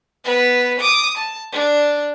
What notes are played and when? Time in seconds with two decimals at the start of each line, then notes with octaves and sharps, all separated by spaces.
0.25 B3 B4
0.80 D6 D#6
1.17 A5
1.52 D4